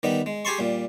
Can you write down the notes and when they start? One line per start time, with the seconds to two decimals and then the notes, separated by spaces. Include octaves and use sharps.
0.03 D#3 G3 B3
0.26 G#3
0.45 G4 G#4 G#5 A5 C6 C#6
0.59 A#2 G3